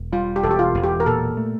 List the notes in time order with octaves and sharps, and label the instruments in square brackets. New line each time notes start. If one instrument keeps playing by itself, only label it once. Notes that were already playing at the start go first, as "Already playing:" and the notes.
Already playing: [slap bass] E1
[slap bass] G3 [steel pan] F4
[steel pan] G4
[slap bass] E1 [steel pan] A4
[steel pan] G4
F4
[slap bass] E1
[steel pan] G4
A#4
[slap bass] A#2 [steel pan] A4
[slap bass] A3